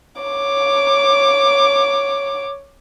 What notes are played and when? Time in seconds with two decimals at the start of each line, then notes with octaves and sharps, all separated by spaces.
0.22 C#5 D6